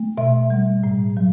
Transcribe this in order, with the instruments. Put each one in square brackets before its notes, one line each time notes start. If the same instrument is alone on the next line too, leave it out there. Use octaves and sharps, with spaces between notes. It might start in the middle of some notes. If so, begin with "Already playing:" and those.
Already playing: [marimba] A3
B2 E5
G3
A2
F#3